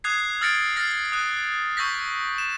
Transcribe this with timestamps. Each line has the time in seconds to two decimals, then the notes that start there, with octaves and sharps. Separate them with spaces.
0.04 D#6 F#6 G#6 C7
0.41 E6 F6 A6 A#6 C#7 D7
0.76 F6 A6 A#6 C7
1.12 D#6 F#6
1.77 C#6 E6 G6 A#6 B6
2.38 E7